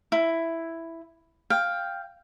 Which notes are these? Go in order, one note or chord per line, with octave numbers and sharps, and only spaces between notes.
E4
F5 G5